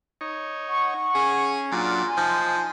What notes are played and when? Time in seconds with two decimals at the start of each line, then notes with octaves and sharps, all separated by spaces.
0.21 D#4 C#5
0.69 F#5 C#6
1.15 C#4 G#4
1.72 A#2 F#3 D4 F6
2.05 G#5 C6
2.17 F3 D#4